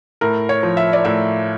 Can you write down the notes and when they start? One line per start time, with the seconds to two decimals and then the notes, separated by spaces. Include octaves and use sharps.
0.21 A2 A#4
0.49 C#5
0.63 F3
0.77 E5
0.93 D5
1.05 A2 E5